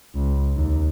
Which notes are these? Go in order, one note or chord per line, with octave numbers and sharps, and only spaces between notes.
C#2
D#2